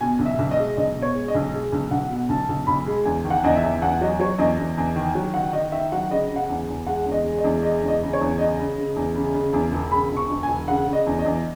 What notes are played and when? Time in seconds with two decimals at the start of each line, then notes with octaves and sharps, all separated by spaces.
0.01 B2 G#5
0.19 B1
0.26 E5
0.39 B1
0.51 D#5
0.58 G#3
0.77 B1 D#5
0.96 B2
1.02 C#5
1.14 G#3
1.28 D#5
1.35 B1
1.54 G#3
1.72 B1
1.91 B1 F#5
2.10 B2
2.29 B1 A5
2.49 B1
2.67 B1 B5
2.86 G#3
3.05 E2 G#5
3.25 D#3
3.30 F#5
3.44 E2 D#5
3.56 E5
3.63 E2
3.81 E2 F#5
4.01 F#3 D#5
4.20 F#3 C#5
4.39 E2 D#5
4.59 E2
4.77 E2
4.96 D#3
5.15 F#3
5.34 D#3 F#5
5.53 D#3 D#5
5.72 D#3 E5
5.92 F#3 F#5
6.10 C#3 D#5
6.30 C#3
6.36 F#5
6.49 E2
6.68 E2
6.87 G#3 F#5
7.06 E2
7.12 D#5
7.24 G#3
7.38 D#5
7.44 E2
7.63 G#3 D#5
7.83 E2
7.88 D#5
8.02 C#3
8.13 C#5
8.21 E2
8.39 C#3 D#5
8.59 C#3
8.78 C#3
8.96 E2
9.15 C#3
9.34 C#3
9.53 E2
9.72 E1
9.92 C#3 B5
10.11 E1
10.17 C#6
10.30 E1
10.43 G#5
10.48 E1
10.68 C#3 F#5
10.87 C#3
10.93 D#5
11.06 E2
11.19 D#5
11.25 E2